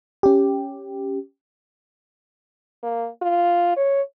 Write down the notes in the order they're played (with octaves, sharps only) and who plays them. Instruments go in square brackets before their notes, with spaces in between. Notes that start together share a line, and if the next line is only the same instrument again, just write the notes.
[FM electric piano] C#4 G4
[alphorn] A#3
F4
C#5